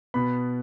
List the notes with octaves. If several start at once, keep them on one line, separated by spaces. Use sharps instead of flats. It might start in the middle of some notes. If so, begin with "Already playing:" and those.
B2 B3 B5